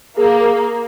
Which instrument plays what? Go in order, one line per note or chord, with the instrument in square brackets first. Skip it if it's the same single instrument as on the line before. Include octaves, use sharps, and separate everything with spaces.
[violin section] A#3 [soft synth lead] G#4